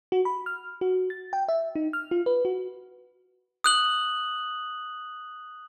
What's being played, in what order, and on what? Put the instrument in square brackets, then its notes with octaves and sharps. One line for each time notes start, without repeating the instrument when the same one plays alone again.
[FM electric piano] F#4
B5
F6
F#4
A6
G5
E5
D#4
F6
F4
B4
F#4
[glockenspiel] D#6 F#6 F#7